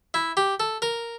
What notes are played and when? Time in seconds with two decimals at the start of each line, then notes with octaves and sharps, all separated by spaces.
0.14 E4
0.37 G4
0.60 A4
0.82 A#4